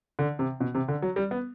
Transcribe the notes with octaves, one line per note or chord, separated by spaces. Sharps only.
D3
C3
B2
C3
D3
F#3
G3
B3